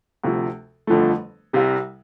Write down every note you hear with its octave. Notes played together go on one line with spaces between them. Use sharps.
D2 C3 F3
G1 F2 D3 F3 A3
C2 C3 G3